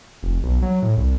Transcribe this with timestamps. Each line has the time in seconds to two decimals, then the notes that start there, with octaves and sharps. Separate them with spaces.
0.23 F1
0.43 B1
0.62 F#3
0.82 A2
0.97 C2